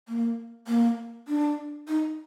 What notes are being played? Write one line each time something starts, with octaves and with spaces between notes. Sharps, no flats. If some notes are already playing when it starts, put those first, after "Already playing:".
A#3
A#3
D4
D#4